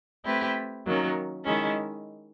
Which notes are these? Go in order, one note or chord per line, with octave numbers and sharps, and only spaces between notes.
A3 C4 E4 G4 B4
D#3 F#3 A#3 C#4
D#3 G#3 C#4 E4